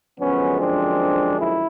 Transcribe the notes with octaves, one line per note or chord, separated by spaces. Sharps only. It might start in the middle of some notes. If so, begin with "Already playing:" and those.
F#2 D3 F3 G#3 B3 C#4
C4 D4
E4